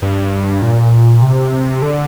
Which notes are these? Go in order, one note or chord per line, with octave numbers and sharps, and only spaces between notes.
G2
A#2
C3
D3